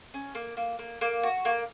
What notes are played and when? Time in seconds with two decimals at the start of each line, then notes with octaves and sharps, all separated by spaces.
0.14 C#4
0.35 A#3
0.57 A#3
0.79 A#3
1.01 A#3
1.23 F#4
1.45 A#3